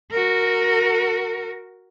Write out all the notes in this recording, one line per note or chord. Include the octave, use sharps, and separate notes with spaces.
F#4 A#4